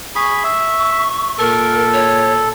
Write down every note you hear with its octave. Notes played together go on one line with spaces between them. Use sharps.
G#4 B5 C#6
E5
A#2 A4 A#4
C#5